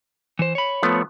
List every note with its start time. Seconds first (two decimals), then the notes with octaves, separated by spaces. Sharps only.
0.39 E3 C5
0.55 C#5 B5
0.83 F3 A3 B3